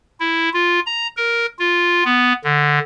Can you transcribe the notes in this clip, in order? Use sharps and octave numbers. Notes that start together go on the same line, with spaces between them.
E4
F4
A#5
A#4
F4
B3
D3